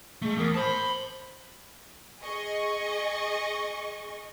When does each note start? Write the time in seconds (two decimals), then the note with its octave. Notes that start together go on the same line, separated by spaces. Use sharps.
0.22 G#3 A3
0.38 E2 A#4
0.54 C5 A5 B5
2.19 G#4 D#5 C#6